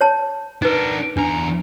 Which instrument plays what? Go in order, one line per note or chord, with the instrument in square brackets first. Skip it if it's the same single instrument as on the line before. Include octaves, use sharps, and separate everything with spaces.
[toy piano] C#5 A5
[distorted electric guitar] D4 A#4 [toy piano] D#4 B4
[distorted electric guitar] E2 A#5 [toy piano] D4